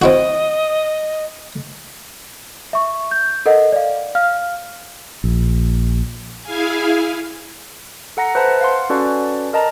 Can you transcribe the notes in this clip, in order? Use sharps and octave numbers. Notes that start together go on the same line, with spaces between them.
C4 E4 F#4 D#5
E5 C#6
G6
A4 A#4 D#5 F#5
D5 F5
F5 F6
A#1
E4 G#4 F5 G#5
A4 F#5 A#5 A#6 C#7
B4 C5 E5 A5
F5 F#5 C6
C#4 F#4 A4 B4 D5 A5
A#4 D#5 A5 A#5